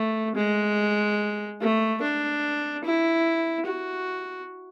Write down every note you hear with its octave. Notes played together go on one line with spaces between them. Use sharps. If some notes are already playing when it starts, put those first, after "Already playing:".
Already playing: A3
G#3
A3
D4
E4
F#4